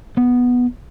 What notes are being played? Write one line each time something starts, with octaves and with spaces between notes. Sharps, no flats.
B3